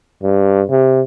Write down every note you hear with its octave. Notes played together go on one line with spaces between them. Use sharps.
G2
C3